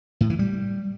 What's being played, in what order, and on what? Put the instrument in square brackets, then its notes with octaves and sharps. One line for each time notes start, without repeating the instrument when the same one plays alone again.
[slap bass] A2
E3
G3